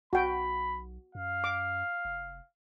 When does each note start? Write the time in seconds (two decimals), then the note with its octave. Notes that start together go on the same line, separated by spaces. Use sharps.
0.13 B1 F#4 G5 B5
1.15 F#2 F5
1.44 D6
2.05 F1